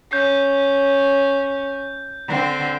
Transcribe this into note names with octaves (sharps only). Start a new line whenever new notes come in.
C#4 G6
D3 C4